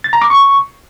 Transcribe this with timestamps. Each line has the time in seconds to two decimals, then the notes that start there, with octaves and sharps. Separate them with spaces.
0.04 A6
0.13 A#5
0.22 D6
0.30 C#6